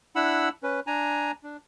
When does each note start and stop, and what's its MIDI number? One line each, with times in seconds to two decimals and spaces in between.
0.16 0.49 62
0.16 0.49 64
0.16 0.49 78
0.16 0.49 83
0.16 0.49 88
0.63 0.80 61
0.63 0.80 71
0.87 1.31 62
0.87 1.31 80
0.87 1.31 82
1.43 1.57 62